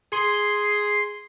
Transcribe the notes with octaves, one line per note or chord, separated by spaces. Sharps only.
G#4 C6